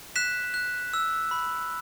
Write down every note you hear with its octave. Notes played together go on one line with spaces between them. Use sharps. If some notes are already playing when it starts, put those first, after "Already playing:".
F#6 B6 E7
F#6
E6
B5